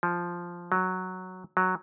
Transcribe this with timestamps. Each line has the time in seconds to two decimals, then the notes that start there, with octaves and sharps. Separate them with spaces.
0.03 F3
0.72 F#3
1.57 F#3